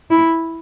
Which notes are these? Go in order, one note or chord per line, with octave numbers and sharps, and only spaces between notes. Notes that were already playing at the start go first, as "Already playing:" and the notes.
E4